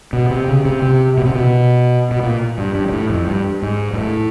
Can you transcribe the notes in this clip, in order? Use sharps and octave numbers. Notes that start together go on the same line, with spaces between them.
B2
C3
C#3
C3
C3
B2
C3
B2
B2
A#2
G2
G2
A#2
A2
F2
G2
G#2
G#2
A2